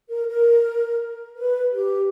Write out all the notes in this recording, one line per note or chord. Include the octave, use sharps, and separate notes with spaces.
A#4
A#4
B4
G4